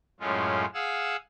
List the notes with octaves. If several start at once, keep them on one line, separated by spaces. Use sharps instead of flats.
F#2 A2 G#3 C#4 F4
G#4 F5 F#5 E6